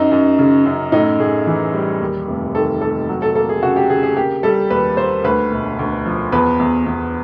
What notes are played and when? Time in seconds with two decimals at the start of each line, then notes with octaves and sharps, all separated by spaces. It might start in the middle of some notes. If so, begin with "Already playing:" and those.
Already playing: F#2 D#4
0.12 F#2
0.39 C#3
0.65 F#2
0.92 A2 D#4
1.19 A2 G#4
1.47 E3
1.74 G3
2.01 D#2
2.28 F1
2.55 D#3 A4
2.81 F1 A4
3.09 F#3
3.22 A4
3.35 A#3 A4
3.49 G#4
3.63 C#3 F#4
3.76 G4
3.90 C#3 G#4
4.03 G#4
4.16 A#3 G4
4.43 G3 A4
4.70 D#2 B4
4.97 A#3 C5
5.24 D2 B4
5.51 E1
5.79 D2
6.06 F3
6.32 E2 B4
6.59 E2
6.86 E2